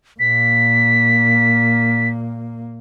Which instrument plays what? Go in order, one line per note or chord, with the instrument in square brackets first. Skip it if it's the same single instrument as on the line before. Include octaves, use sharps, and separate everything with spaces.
[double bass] A#2 A#3 [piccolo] B6